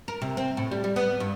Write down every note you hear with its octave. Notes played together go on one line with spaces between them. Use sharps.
A#4
C3
C4
A2
G3
G3
B3
G2